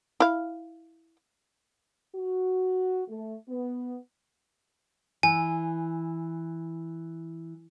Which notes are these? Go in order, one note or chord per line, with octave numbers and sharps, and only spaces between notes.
E4 F5
F#4
A3
B3
E3 G#5